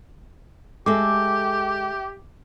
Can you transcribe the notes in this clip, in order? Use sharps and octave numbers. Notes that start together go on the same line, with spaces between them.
G#3 G4 A4 E5 D6